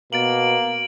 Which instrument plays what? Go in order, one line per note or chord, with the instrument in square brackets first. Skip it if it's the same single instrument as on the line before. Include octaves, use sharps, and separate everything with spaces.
[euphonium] B2 [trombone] A#3 [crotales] A6 D7 F#7